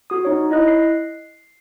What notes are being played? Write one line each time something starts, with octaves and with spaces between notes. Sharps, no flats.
F#4 D#6
D#4 C#5
E4 D#5 F#6
C7